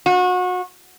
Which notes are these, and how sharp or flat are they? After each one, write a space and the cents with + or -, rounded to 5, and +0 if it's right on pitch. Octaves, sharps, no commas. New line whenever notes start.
F#4 -30